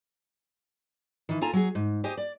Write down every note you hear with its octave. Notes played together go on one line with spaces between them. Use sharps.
D#3 E3
F4 A4 G#5 A#5
F#3 G#4
G#2
G4 C5 D#5 G#5
D5